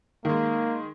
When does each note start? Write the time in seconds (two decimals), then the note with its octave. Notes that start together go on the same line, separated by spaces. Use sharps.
0.25 D#3 G#3 A#3